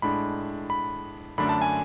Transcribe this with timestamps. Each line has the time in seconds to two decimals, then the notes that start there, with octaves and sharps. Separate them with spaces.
0.02 A2 G#3 D4 B5
0.70 B5
1.38 F#2 D3 A3 D4 B5
1.49 A5
1.62 G#5